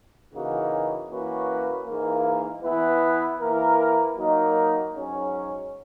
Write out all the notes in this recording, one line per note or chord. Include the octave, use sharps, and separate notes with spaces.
C#3 E3 A#3 D#4 F#4
E3 A#3 C#4 F#4 B4
G#2 E3 A#3
E3 B3 E4 B4
E3 A#3 E4 A#4
F#3 A#3 D#4 F#4 A#4
G#2 F#3 C#4